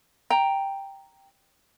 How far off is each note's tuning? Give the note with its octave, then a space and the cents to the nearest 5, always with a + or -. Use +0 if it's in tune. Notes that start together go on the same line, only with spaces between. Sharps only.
G5 +0 A#5 +0